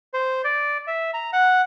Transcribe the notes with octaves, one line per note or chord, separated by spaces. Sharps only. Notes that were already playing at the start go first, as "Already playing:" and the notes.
C5
D5
E5
A#5
F#5